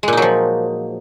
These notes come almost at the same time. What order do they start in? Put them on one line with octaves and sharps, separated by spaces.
G#3 A#2 D#4 F#3 F3